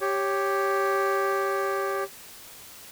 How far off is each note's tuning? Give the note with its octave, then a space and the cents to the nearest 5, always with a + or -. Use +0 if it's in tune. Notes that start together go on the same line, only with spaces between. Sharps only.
G4 +0 C#5 +0